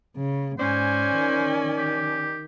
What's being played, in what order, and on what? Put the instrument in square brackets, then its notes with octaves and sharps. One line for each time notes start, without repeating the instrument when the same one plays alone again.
[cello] C#3
[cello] G#2 [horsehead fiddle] C#4 G#5 [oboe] C5 [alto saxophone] D5
[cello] D#3
[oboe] G4